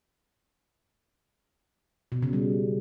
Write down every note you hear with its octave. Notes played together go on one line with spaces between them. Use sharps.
B2
C#3
G3